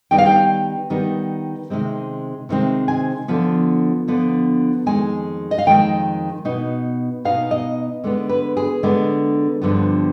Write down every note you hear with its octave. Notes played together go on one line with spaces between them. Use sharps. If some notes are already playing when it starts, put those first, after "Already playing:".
D#3 G3 B3 D#4 G5
F5
G5
D#3 G3 B3 D#4
C3 D#3 G#3 C4
C3 D#3 G#3 C4
G#5
D3 F3 B3
D3 F3 B3
F2 D#3 G#3 G#5
D#5
F5
F2 D#3 G#3 G5
B2 B3 D#4
B2 B3 D#4 F5
D#5
D3 G#3 B3
B4
G#4
D3 G#3 B3
G2 D3 F3 B3